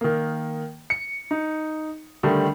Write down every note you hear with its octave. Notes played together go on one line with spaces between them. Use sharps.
D#3 A#3
C#7
D#4
D3 D#3 G3 A3